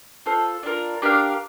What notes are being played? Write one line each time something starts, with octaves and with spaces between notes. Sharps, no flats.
F4 A4 C5
D4 F4 A#4
D4 G4 A#4 F5